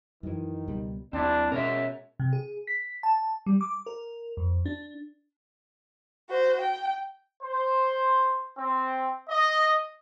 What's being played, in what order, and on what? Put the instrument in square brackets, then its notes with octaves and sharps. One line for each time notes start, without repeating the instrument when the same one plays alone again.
[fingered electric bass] F#2 E3 [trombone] D#3
[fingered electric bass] C#2 B2 G3
[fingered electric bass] D#2 [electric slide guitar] C4 E4 [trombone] D4
[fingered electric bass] B2 C#4 [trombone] G#3 [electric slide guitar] A#4 C#5 E5
[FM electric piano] C3
G#4
B6
A5
G3
D6
A#4
F2
D4
[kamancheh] F#4 C5
G5
[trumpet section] C5
C4
D#5